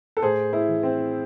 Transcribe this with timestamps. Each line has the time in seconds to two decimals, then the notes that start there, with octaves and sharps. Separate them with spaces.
0.17 A4
0.22 A2 G#4 C5
0.53 E4 G#4
0.68 E3
0.83 C4